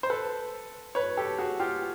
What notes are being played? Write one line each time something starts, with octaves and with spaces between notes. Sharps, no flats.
C5
A4 B4
B4 C#5
G4 A4
F#4 G#4
F4 G4